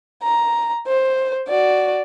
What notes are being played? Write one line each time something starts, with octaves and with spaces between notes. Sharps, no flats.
A#5
C5
F#4 D5